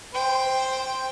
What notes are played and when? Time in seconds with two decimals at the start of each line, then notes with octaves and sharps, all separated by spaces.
0.14 C5 G5